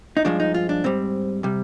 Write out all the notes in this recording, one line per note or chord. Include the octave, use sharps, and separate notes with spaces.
D#4
G2 F3 G#3 D4
D#4
F4
D4
G#2 G3 C4
C3 G3